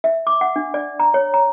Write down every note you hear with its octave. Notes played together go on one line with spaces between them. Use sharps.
E5
D6
F#5
D4
D5
A#5
C#5
A#5